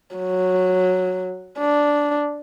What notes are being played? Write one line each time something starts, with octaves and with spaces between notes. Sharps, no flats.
F#3
D4